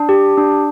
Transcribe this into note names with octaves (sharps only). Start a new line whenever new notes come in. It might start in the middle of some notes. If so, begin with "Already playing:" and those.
Already playing: D4
G4
D4